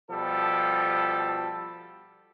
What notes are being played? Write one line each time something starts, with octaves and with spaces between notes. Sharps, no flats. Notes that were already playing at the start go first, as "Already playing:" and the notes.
B2 F3 G3 A4